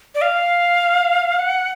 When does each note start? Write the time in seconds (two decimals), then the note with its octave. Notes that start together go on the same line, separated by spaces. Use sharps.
0.15 D5
0.22 F5
1.39 F#5